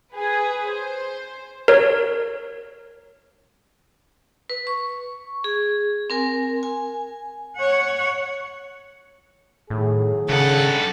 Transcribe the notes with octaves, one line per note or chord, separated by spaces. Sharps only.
G#4 B4
C5
A#4 C#5
B4
C#6
G#4
C4 A#4 G#5
G#5
C#5 F#5
A2 D#3 F#3 G#4
G2 C#3 A4 F#5